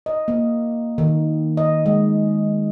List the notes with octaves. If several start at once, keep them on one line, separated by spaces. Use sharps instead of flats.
D#5
A#3
D#3
D#5
G#3